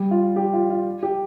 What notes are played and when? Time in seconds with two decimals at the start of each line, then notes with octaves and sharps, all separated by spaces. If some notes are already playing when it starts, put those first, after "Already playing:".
Already playing: G3
0.11 F4
0.36 G4
0.53 F4
0.70 F4
1.03 G4